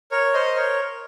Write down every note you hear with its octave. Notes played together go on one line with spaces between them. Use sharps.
A#4 C#5
C5 D#5
A#4 C#5